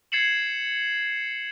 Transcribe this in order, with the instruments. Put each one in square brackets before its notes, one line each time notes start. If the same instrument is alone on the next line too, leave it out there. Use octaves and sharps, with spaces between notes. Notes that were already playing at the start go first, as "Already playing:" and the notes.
[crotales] G#6 A6 C7 C#7 E7 F#7